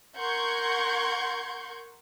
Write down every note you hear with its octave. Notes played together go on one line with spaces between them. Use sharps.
A#4 F#5 C6 C#6 G6 G#6